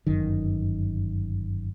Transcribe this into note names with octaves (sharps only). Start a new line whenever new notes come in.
G1 F#2 D#3